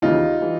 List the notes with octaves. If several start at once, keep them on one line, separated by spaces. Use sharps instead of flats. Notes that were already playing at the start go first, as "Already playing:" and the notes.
D#2 C#3 E3 D#4 F4
E3 G3